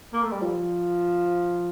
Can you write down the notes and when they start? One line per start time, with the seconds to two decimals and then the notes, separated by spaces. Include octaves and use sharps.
0.13 A#3
0.22 A3
0.31 G3
0.42 F3